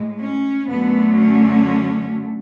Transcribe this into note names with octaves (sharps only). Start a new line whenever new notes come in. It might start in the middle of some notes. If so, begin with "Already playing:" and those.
Already playing: A2 G#3
C#4
F#2 D3 A3 B3
C#4